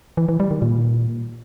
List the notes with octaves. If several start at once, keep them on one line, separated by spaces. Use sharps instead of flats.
E3
E3
G3
D#3
A#2